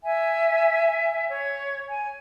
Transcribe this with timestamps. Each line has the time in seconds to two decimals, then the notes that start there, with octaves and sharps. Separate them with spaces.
0.03 E5 G#5
1.29 C#5
1.88 G#5